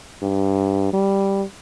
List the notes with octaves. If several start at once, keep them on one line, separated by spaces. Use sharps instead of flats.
G2
G3